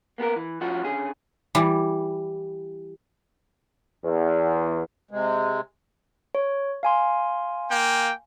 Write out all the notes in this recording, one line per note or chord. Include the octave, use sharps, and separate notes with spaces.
A#3 B3 A4 A#4
E3
F3 C#4 F4 F#4
D3 C#4 G#4
E3 G3
E2
C3 G#3
C#5
F5 G#5 C6
A#3 G5